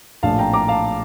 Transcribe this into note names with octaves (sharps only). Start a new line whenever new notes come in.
A#1 A2 F5 A5
G5 A#5
A#5 D6
F5 A5